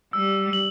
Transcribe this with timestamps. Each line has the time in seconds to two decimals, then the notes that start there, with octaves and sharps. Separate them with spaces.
0.13 G3 E6
0.53 F#7